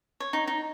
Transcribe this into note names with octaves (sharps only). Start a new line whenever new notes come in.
C#5
D#4
D#4